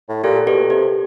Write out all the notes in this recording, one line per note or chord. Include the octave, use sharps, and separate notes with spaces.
A2
A#2 G4 A4
B2 G4 A4
C3 G4